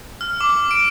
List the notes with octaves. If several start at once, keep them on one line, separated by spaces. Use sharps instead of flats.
F6
D6
D7